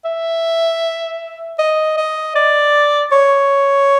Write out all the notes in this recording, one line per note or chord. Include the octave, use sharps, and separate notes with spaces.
E5
D#5
D#5
D5
C#5